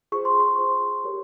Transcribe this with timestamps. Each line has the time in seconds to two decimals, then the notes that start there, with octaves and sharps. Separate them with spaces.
0.12 F4 G#4 C5 C#6
0.25 C6
0.40 C#6
0.58 F4 G#4 C5
1.04 G4 A#4 C#5